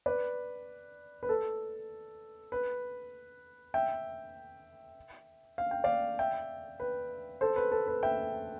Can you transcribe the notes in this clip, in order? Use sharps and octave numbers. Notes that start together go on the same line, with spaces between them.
B4 D5
B4
A4
B4
E5 G5
F5
G5
D5 F5
E5 G5
B4
A4 C5
B4
A4
B4
E5 G5